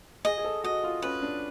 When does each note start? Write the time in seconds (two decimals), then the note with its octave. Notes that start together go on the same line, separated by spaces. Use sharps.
0.25 G#4 D#5
0.37 G#4
0.44 A4
0.64 F#4 D#5
0.84 F4
1.02 C#4 B4
1.22 D4